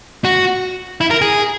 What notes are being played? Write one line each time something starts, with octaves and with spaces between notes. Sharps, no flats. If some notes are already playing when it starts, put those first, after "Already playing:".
F#4
E4
A#4
G#4